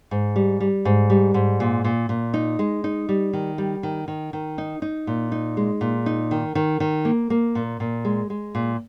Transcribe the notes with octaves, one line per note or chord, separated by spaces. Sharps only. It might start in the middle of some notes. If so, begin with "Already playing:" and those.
G#2
G3
G3
G#2
G3
G#2
A#2
A#2
A#2
D#4
G#3
D#4
G3
D#3
G3
D#3
D#3
D#3
D#4
D#4
A#2
D#4
G#3
A#2
D#4
D#3
D#3
D#3
A#3
A#3
A#2
A#2
G#3
G#3
A#2